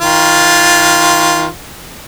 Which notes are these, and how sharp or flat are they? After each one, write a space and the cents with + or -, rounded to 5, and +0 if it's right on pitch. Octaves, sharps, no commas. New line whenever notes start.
D#3 +35 F4 +0